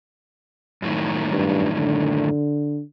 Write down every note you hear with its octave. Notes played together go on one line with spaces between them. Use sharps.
F#2 A2 D#3
G2
D3